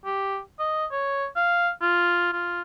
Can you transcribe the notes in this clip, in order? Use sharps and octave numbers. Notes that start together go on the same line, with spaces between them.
G4
D#5
C#5
F5
F4
F4